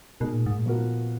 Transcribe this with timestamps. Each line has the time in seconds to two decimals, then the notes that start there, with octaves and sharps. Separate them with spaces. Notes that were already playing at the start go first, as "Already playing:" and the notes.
0.20 B2 G#3 D#4 A#4
0.33 A#2
0.46 G#2
0.58 A#2
0.66 F3 B3 F#4 A#4